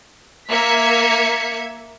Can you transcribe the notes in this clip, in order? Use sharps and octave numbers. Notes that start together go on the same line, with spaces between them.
A#3 E5 G#6 B6 C#7